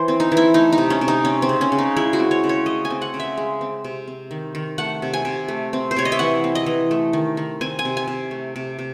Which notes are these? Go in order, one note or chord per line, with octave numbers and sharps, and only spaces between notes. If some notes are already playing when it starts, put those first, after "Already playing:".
Already playing: E3 C5
C4
D#4
E3
E4
A3 D#4
D#4
C3
C#4
C3
D#4
C4 C#4
C4
C#3
C#4
C#3
D#4
G#3 E4
F#4
C4
C#5
C#3
C#5
A3 D#5
G#5
C4
F#5
C#3
E5
G#3
C4
C3
C4
D#3
D#3
A3 F#5
C3
G#5
C3
A3
C4
C5
C3 C#5
D#5
E5
E3 F#5
C4
D#5
E3
A3
D#3
D#3
C4 G#5
G#5
C3
G#5
C3
A3
C3
C3